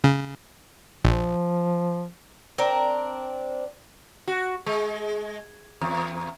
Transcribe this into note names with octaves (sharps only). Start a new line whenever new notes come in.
C#3
A#1 F3
C4 D4 A#4
F#4
G#3
E2